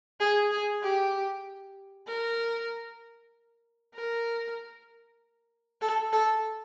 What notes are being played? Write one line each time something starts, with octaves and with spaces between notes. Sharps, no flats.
G#4
G#4
G4
A#4
A#4
A4
A4